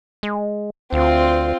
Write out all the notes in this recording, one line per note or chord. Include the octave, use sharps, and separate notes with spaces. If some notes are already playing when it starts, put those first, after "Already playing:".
G#3
D2 C4 F4